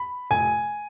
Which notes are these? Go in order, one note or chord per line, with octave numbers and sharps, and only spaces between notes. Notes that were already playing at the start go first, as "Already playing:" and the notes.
Already playing: B5
F1 G#5